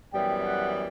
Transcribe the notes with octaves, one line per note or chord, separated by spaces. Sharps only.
F#2 E3 G3 B3 G5
F#5